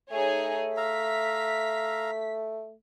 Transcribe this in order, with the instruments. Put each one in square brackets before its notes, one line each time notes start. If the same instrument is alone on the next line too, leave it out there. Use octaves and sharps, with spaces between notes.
[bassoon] A3 [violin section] D#4 G#4 C#5
[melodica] E5 F5 A#5 [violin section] B6